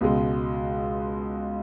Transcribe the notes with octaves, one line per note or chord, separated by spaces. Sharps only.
C#2 B2 G#3